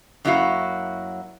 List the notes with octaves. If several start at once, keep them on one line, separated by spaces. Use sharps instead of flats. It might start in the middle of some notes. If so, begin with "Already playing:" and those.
F#2 F#3 A#3 E4 F#4 F5